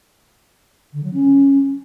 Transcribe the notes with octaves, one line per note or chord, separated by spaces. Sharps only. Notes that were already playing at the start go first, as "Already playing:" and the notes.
D3
F#3
C#4